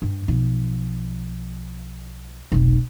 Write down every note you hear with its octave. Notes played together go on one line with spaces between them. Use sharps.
G2
B1 F3
F1 B1